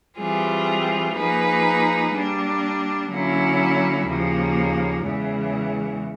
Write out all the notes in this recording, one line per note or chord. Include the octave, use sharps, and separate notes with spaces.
E3 G3 C4 F4 G#4
F3 A#3 D#4 G#4 B4
G3 A#3 D4
D3 F#3 A#3 C#4 E4
D#2 C#3 F3 A#3
E2 C#3 E3 G#3